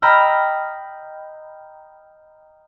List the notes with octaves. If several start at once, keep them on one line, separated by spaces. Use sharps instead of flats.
D#5 G5 A#5 B5 E6 F6